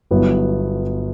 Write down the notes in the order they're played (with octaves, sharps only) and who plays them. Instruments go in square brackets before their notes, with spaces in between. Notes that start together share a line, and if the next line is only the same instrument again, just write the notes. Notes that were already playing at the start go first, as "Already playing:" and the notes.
[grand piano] G1 G2 F#3 B3 E4